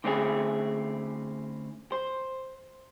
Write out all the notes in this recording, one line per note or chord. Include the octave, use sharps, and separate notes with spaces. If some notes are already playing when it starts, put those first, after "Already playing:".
D3 A3 C4 C#4 E4 G#4
C5